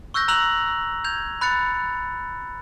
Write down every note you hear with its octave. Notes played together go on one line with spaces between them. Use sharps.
C#6 E6 F#6 G6 A#6
A#5 E6 F#6 F7 F#7
G6 G#6 F7
B5 F#6 A6 C#7